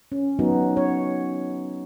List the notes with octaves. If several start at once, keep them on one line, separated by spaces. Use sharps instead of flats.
C#4
F#3 B3 D#4 F#4
C#4 C#5